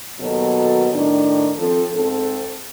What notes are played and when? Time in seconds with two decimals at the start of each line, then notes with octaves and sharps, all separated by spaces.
0.20 D#2 B2 F#3 A4
0.93 A2 D#3 D4
1.57 F3 C4 A4
1.94 G#2 C4 A4